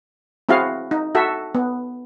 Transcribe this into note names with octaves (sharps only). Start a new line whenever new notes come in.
C4 E4 F#4 G#4 F5
D#4
F#4 A4 E5
B3